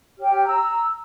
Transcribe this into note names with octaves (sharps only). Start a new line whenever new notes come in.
G4 C#5 G5 F6
A#5 E6